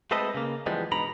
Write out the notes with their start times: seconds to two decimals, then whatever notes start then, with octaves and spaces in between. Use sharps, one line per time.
0.11 G#3 A3 C4 A4 B4 D#5
0.34 C#3 A#3
0.66 E3 F3 G3 G#3 B3
0.92 G#2 B2 D4 A#5 B5